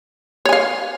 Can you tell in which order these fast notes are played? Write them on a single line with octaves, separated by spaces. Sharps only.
C#5 G#5 F5